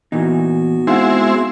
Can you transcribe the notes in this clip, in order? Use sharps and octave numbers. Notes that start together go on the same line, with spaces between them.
A#2 E3 B3 D#4 F#4
G#3 C4 D#4 E4 F5 F#5